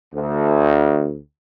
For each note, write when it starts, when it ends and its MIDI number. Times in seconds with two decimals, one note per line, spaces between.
0.13 1.17 38